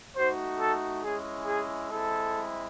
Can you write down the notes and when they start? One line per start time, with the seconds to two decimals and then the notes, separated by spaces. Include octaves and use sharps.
0.16 A3 D#4 F#4 C5
0.60 A4
1.04 G#3 C#4 E4 G#4
1.47 G#4
1.91 G#3 C4 E4 A4